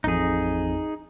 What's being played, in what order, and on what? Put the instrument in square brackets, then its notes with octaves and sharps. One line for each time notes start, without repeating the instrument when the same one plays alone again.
[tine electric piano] A1 F2 [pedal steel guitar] D#4 G#4